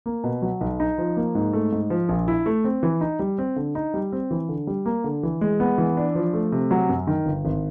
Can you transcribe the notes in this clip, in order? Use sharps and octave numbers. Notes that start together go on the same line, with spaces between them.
A#3
B2
F#3
B1
D#4
F3
A#3
G#2
A3
G#2
F3
A#1
E4
A3
C4
E3
D#4
G3
C4
D3
D#4
G3
C4
E3
D3
G3
A#3
D3
E3
G#3
B3
E3
D4
F3
A3
C3
F#3
F#2
D#3
G1
G#1